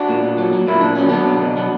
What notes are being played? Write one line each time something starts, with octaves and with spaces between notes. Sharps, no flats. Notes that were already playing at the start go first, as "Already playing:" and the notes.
Already playing: D4 F#4
A#2
A#2
F#3
F#3
A#2 E4
A#2 D4
F#3 C#4
F#3 B3 D4
B2
B2
F#3